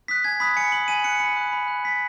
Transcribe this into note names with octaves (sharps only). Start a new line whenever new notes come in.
D#6 F#6 B6
G#5 G#6
B5 D#6 F#6 B6
G#5 C#7
D#6 F#6 F#7
G#5 D#7
B5 F#6 C#7
B5 C#7
D#6 F#6
B5
F#6
B5 B6